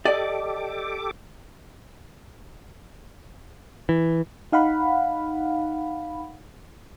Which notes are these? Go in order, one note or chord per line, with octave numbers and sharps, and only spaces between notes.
G4 A4 D5 D#5 D6
E3
D#4 F5 F#5 B5